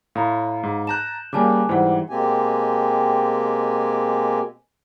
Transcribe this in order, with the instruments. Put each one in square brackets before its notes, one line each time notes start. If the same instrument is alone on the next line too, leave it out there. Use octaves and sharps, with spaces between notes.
[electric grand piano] A2 [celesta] F5 A#5 B5
[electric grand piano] G#2
[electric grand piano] A5 A#5 F#6 [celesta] G6 E7
[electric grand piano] C#3 G3 A#3 [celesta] G#5 A5 D6
[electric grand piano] G#2 E3 G3 [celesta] C5 F#5
[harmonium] B2 G#3 A#3 C4 G4 G#5